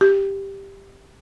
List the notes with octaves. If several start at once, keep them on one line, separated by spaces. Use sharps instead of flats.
G4